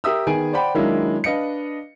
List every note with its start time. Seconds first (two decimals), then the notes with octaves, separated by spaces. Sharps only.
0.04 G4 A#4 E5 D#6 E6
0.27 D#3 B3 G#4 G#5 D7
0.53 C5 D5 F#5 G5 B5
0.75 D#3 F#3 G#3 A#3 D4 E4
1.24 D4 B4 D#5 F5 C#7